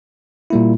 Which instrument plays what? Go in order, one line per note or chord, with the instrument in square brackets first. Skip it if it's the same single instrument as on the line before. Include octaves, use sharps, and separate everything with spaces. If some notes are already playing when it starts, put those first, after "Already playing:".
[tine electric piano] A#2 G3 A#3 E4